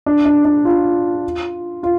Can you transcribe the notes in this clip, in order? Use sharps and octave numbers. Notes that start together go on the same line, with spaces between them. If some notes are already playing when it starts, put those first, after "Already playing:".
D4
D4
D4
F4
F4